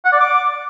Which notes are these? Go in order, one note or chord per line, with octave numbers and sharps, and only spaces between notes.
F#5
D5
D6